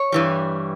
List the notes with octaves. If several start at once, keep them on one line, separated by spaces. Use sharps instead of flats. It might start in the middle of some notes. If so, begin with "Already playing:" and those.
Already playing: C#5
G2 E3 G3